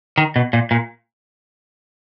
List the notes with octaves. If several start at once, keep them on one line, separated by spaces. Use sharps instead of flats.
D#3
B2
A#2
A#2